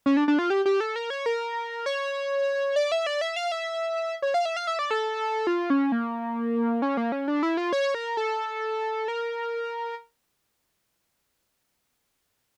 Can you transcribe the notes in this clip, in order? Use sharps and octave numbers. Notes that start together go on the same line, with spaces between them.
C#4
D4
D4
F4
G4
G4
A4
A#4
C#5
A#4
C#5
D5
E5
D5
E5
F5
E5
C#5
F5
E5
F5
E5
D5
A4
F4
C#4
A#3
C#4
A#3
C#4
D4
E4
F4
C#5
A#4
A4
A#4